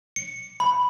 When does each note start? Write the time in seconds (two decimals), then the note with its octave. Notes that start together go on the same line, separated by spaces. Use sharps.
0.16 C#7
0.60 B5